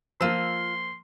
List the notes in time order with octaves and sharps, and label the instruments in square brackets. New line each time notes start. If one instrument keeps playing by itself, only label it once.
[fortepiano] F3 A#3 [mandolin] F4 E6 [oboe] C6